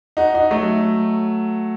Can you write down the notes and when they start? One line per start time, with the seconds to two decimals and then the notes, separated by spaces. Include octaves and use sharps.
0.17 D#4 F#4
0.34 D#4 F#4
0.51 F#3 A3